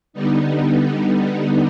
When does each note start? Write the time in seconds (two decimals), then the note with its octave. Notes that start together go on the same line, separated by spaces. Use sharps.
0.13 D3 G3 B3 D#4